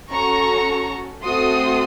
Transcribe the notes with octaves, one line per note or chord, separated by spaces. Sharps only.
C#4 F#4 A4 A#5 C#6
A3 C4 F#4 A4 C6 D#6